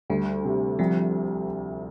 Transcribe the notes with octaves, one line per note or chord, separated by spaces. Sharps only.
D2 G3
C3
C2 F3